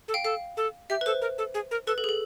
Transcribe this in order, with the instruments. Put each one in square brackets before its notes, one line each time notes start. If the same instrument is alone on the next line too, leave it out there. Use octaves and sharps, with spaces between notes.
[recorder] A4
[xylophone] F5 G5
[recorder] A4 [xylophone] F5
[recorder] A4
[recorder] G4 [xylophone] E5
[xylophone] B4
[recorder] A4 [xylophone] C5
[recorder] A#4
A4
G#4
A#4
[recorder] A4 [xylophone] B4
[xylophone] A4
G#4
A4